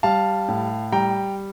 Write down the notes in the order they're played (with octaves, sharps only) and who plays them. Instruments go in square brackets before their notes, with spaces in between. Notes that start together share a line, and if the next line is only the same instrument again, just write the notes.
[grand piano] G3 F5 A5
A2
G3 G5 A#5